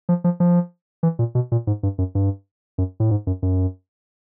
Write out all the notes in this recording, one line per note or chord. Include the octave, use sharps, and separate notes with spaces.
F3
F3
F3
E3
A#2
B2
A#2
G#2
G2
F#2
G2
F#2
A2
G#2
F#2
F#2